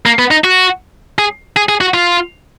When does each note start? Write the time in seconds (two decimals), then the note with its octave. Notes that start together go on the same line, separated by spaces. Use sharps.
0.06 A#3
0.19 B3
0.31 D#4
0.44 F#4
1.18 G#4
1.56 G#4
1.69 G#4
1.81 F#4
1.94 F4